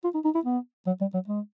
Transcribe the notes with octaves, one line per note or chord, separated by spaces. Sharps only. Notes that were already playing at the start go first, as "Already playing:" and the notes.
F4
D#4
D#4
E4
B3
F#3
G3
F#3
G#3